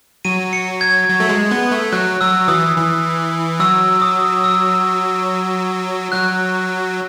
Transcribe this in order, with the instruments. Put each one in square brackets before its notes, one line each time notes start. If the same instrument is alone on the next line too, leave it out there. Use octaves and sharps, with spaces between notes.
[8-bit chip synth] F#3 [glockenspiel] D#7
[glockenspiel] C#7
G#6
[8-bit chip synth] F#3
A3
G#3
B3
A3
[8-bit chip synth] F#3 [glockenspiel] F#6
[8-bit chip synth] F#3 [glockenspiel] E6
[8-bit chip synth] E3 [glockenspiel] D#6
[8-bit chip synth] E3
[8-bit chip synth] F#3 [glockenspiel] E6
[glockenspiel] D#6
E6
[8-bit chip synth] F#3 [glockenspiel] F#6